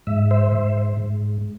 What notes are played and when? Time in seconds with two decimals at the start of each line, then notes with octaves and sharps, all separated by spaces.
0.07 G#2 E5
0.31 C5 E5
0.52 G#2
0.97 G#2